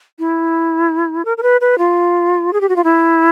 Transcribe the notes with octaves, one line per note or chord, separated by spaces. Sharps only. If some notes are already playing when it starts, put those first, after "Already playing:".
E4
A#4
A#4
B4
B4
F4
G#4
G4
F#4
F4
E4